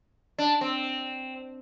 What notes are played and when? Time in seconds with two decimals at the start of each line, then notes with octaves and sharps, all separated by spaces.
0.38 D4
0.61 C4